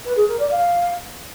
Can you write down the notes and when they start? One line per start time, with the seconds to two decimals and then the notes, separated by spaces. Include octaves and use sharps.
0.04 B4
0.16 G#4
0.28 A#4
0.39 D5
0.51 F5